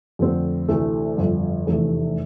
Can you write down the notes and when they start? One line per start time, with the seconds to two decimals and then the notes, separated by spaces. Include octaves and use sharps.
0.19 F2 D3 A3 C4
0.68 D2 C3 E3 A3
1.18 G1 F2 D3
1.67 F1 E2 C3 E3 A3